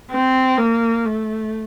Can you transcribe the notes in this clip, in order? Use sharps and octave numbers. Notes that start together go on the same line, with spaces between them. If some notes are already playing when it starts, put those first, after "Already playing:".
C4
A#3
A3